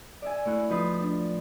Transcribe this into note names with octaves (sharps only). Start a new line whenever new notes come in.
D5 E5 G#5
A2 E4 F#6
F3 D#4 B4
D4